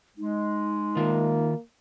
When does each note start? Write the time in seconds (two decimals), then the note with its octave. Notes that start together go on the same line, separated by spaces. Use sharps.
0.17 G#3 D#4
0.96 D#3 A#3 F4